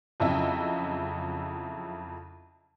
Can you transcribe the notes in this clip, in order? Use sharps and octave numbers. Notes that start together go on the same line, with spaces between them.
F2 C#3 F#3 E4 D#5 E5